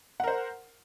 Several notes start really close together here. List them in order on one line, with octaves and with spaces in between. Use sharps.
F#5 A#4 C5